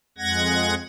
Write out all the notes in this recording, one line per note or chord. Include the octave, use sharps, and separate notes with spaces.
F2 G#3 F#5 G#6 A#6